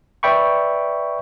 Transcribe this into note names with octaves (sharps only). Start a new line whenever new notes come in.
B4 D5 E5 G5 B5 C#6